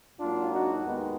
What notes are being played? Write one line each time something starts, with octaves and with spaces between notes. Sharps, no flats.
G#2 F#3 A#3 D4 F4
D#4 F#4
D#2 D#3 G#3 B3